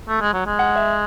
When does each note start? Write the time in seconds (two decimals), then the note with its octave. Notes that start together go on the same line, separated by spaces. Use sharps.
0.08 A3
0.21 G#3
0.34 F#3
0.46 G#3
0.59 F#5
0.76 E5